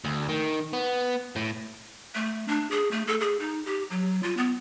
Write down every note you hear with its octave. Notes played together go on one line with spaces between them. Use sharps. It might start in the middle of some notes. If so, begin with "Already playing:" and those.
D2
D#3
B3
A2
A3
D4
G#4
A3
A4
G#4
D#4
G4
F#3
F4
B3